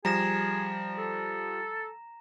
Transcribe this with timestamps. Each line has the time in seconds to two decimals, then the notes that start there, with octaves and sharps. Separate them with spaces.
0.05 F3 G3 G#4 A#5 A#6 E7
0.98 A4